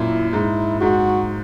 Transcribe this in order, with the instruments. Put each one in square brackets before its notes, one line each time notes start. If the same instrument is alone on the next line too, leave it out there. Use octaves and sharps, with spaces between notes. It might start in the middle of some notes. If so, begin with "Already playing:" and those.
Already playing: [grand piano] F#2 A#2 [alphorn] E4
[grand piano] G#2 [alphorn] E4
[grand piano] G#2 [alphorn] F#4